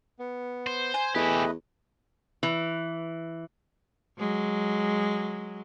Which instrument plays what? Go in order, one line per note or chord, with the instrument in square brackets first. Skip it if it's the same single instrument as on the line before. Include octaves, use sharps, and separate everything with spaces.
[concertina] B3
[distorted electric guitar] C5
[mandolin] G#5
[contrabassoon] E2 [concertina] A3 B4 D#5 [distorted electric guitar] E4 G4
[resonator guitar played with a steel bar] E3
[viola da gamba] F#3 G#3